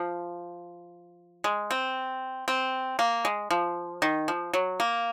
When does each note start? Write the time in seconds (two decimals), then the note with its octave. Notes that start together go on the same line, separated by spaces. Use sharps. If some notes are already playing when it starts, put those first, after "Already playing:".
Already playing: F3
1.44 G#3
1.71 C4
2.48 C4
2.99 A#3
3.25 G#3
3.51 F3
4.02 D#3
4.28 F3
4.53 F#3
4.80 A#3